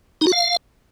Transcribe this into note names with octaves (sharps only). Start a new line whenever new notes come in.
D#4
F#4
F5